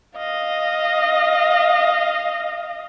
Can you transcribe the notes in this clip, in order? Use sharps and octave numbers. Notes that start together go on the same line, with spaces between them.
D#5 F5